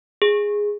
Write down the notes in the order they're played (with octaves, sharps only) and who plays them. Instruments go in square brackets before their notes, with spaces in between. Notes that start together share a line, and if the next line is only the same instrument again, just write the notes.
[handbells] G#4